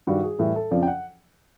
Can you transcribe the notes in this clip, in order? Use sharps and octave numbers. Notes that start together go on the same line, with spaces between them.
G2 D#3 G3 F#4
G#4
A2 E3 G3 A4
A4
F2 C#3 F3 D5
G5
F#5